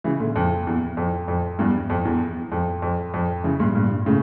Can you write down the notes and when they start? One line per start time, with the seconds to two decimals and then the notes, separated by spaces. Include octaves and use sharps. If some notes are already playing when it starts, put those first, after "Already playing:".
0.04 C#3 E3
0.20 A#2 D3
0.36 F2
0.67 E2
0.97 F2
1.28 F2
1.59 E2 G2
1.90 F2
2.05 E2
2.52 F2
2.82 F2
3.14 F2
3.44 C#3 E3
3.60 G2 A#2
3.75 G2 A#2
4.06 A2 C#3